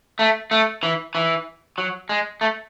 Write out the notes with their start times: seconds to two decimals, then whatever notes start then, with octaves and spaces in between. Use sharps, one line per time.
0.19 A3
0.51 A3
0.83 E3
1.15 E3
1.78 F#3
2.09 G#3
2.41 A3